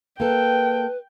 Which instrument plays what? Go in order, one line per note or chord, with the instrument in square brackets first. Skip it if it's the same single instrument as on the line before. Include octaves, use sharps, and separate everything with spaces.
[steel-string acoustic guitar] A#3 A4 [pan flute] B4 [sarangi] G5